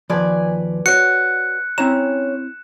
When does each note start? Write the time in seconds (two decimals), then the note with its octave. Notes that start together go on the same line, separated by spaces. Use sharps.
0.10 D#2 F3 B4 D5 G#5
0.86 F#4 C#5 F#6 C#7
1.78 C4 C#4 E4 A#5 E7